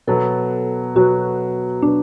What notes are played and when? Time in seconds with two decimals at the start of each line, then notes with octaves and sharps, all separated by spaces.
0.07 B2 F#3 B3 A4
0.95 B2 F#3 B3 F#4
1.82 B2 F#3 B3 D4